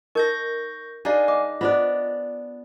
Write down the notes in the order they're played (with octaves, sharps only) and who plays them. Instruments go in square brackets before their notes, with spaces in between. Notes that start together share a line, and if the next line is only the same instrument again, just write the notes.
[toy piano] D#4 A#4 D#5 [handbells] C#6 G6 A#6
[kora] D4 D#4 G#4 [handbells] D5 F5 G#5
[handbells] D#5 [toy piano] D6
[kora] B3 D4 D5 [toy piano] F4 C5